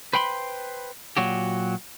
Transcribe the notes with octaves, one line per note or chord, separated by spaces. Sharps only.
B4 C5 G5 B5 C6
A#2 F#3 F#4 G4